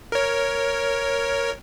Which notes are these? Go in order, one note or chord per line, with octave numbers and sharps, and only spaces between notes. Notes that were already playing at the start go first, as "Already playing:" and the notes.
A#4 C#5